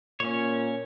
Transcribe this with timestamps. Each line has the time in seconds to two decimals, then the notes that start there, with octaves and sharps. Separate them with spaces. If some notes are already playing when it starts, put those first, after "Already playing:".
0.20 A#2 C#4 C#5